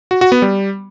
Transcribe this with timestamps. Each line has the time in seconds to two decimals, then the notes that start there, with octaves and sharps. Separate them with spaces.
0.11 F#4
0.21 F#4
0.32 B3
0.42 G3